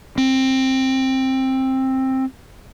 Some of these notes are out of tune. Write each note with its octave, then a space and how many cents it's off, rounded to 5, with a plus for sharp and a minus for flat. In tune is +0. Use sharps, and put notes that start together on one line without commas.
C4 +15